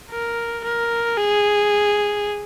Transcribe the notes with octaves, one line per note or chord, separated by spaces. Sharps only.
A#4
A#4
G#4